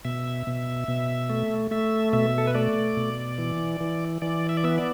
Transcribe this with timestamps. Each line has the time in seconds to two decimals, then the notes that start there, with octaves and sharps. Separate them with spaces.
0.05 B2 E5
0.47 B2
0.88 B2
1.30 A3
1.71 A3 E5
2.13 B2 E5
2.38 A4
2.47 B4
2.55 A3 D5
2.97 B2
3.38 E3
3.80 E3
4.22 E3 D5
4.49 E5
4.57 D5
4.64 B3 E5
4.78 D5